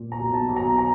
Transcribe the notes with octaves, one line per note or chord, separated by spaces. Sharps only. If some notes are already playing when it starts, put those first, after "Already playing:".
Already playing: A#2
A#5
B1
A5
B1
A#5
A#5